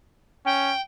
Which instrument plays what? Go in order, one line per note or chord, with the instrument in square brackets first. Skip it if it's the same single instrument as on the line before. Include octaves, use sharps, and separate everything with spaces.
[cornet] C#4 [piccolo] G5